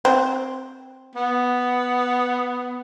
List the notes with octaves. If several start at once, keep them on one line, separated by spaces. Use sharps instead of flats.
C4
B3